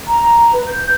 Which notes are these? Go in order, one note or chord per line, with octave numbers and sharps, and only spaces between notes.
A#5
B4
G6